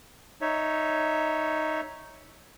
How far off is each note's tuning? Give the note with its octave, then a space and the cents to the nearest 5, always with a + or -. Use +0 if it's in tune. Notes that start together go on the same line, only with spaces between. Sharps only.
D#4 +0 C#5 +0 E5 -10